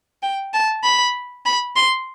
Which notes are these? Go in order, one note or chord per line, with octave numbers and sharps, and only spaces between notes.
G5
A5
B5
B5
C6